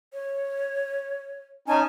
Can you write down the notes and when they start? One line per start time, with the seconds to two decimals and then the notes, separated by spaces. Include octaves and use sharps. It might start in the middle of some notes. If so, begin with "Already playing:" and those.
0.13 C#5
1.68 C#4 D#4 G#5 A5